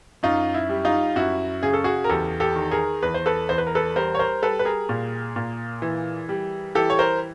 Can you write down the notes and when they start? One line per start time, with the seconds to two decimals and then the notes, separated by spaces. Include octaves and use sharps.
0.23 F#2 D#4 F4
0.54 E4
0.69 G3
0.85 D#4 F4
1.16 F#2 E4 F#4
1.63 C#3 G#4
1.73 A4
1.84 F#4 G#4
2.04 A#4
2.09 E2 G4 A4
2.40 G4 A4
2.56 D#3
2.71 G#4 A#4
3.02 E2 B4
3.14 C5
3.26 A4 B4
3.49 E2 C5
3.58 B4
3.67 A#4
3.75 A4 B4
3.96 G3 A#4 C5
4.15 C#5
4.19 A#4 C5
4.42 G3 A4 B4
4.59 B4
4.65 G#4 A#4
4.89 A#2
5.36 A#2
5.82 E3
6.29 G3
6.75 E3 G4 A4
6.90 C#5
6.99 A#4 C5